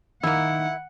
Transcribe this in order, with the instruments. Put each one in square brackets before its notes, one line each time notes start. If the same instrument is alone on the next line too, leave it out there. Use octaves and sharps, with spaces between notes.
[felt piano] D#3 [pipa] A#3 E4 [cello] F#5